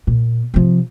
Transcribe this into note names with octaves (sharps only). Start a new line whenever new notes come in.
A#2
C3 F3